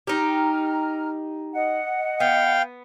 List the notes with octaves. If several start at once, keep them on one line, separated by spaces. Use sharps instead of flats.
D#4 G4 A#5 F6
D#5 F#5
B3 F5 G5